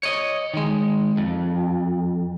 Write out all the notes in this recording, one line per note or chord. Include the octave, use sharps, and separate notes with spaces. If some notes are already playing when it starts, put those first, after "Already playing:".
C#5 D#5
D#3 G#3
F2